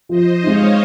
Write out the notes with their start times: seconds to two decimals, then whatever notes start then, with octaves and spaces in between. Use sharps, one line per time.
0.09 F3 C5 D#5
0.42 G#3 D#4 C#5 F5